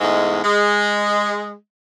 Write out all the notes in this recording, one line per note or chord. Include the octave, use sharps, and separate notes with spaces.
E2 G#2 G#3 A3
G#3